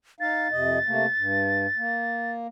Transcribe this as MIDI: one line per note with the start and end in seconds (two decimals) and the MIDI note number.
0.20 0.48 63
0.20 0.48 77
0.20 2.32 93
0.51 0.79 41
0.51 0.79 48
0.51 0.79 75
0.86 1.06 48
0.86 1.06 57
0.86 1.06 58
1.17 1.67 43
1.77 2.47 58